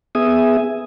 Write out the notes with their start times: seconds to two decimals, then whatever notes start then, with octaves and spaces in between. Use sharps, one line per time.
0.15 B3 G#4 E5 G#5 D#6